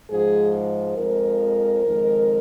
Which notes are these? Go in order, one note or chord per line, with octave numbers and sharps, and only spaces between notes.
G#2 F3 G#3 G#4
F2 F3 G#3 A#4
F2 D#3 G#3